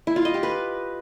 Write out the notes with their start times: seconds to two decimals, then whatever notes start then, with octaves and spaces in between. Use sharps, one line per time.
0.07 E4
0.16 F4
0.25 D#5
0.34 G4
0.43 B4